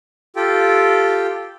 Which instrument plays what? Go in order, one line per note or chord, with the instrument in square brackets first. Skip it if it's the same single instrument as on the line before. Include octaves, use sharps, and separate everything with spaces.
[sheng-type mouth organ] F4 G4 A4 G5